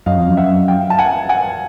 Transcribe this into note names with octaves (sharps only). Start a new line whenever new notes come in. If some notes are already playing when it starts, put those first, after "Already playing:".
F#2 D#5 F5
F2
F#2
E5 F#5
F5 G5
A5
F#5 G#5
F#5 G#5